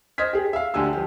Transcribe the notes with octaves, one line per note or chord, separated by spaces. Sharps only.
C5 D#5 F6 G#6 B6
G4 G#4
E5 F5
D2 D3 G4 G#5 E6
F3 G4